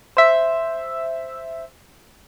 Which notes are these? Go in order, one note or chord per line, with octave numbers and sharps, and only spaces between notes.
C5 E5